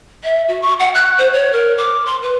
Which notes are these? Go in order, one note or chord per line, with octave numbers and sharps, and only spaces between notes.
E5
F#4
C#6
F#5
F#6
C5
C#5
A#4
D6
C6
B4